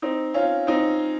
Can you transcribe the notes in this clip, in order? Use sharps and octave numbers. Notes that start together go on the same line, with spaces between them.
C4 D#4
C#4 F4
C4 D#4